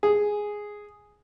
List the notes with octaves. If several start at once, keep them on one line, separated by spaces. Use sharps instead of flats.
G#4